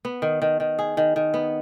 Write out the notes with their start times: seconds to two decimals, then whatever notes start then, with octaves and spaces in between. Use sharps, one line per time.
0.05 B3
0.22 D#3
0.42 D#3
0.60 D#3
0.79 G#4
0.97 D#3
1.16 D#3
1.34 B3